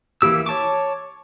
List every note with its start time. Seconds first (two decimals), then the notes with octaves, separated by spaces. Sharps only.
0.22 E3 A#3 E4 G4 E6
0.46 C#5 A5 C#6 D6